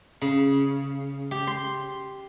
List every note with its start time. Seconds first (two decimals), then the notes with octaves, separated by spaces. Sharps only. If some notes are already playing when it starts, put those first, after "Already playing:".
0.22 C#3
1.31 G4
1.47 C6